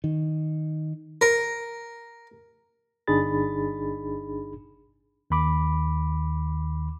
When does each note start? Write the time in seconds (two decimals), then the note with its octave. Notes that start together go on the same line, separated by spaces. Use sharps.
0.04 D#3
1.21 A#4
3.07 G1 D4 D#4 G#4 B5 A6
5.30 D#2 D#3 B5 D6